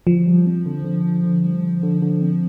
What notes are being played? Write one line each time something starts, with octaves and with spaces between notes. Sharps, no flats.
D3 F3
G3
C4
D3
D3
D3
D3
G3
D3
D3
D3
C4